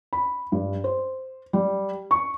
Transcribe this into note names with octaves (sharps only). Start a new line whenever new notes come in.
B5
G2
C5
G3
C#6